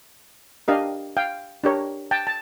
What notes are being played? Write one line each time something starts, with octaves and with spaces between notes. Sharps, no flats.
D4 G4 A#4 D#5 F5
F5 G5
D4 G4 A#4 C#5
G5 A5
A5